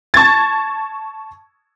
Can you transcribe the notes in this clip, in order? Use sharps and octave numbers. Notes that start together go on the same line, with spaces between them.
A5 C#6 G#6 A6